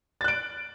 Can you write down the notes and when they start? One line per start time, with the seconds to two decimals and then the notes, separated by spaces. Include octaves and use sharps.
0.21 A6
0.24 F#6
0.28 D7